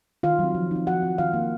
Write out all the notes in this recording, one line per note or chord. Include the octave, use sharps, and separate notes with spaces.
D#3 F4 F5
F#3 C4
F3
C4 D#4
F3 F#4 F#5
C4 F4
D#3 F4 F5
A#3 D#4